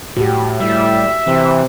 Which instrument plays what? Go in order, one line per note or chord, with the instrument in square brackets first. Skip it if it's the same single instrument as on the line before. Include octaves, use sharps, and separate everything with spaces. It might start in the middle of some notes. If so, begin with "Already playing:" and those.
[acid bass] A2 [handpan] F#4 G4
[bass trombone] A2 [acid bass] G3 [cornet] E5
[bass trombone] C3 [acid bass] E3